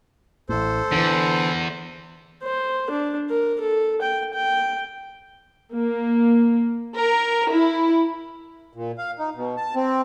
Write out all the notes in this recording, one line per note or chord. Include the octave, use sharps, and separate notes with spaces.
A1 A2 A4 C5
E2 D3 E3
C5
D4
A#4
A4
G5
G5
A#3
A#4
E4
A#2
F5
D#4
B2
A5
C4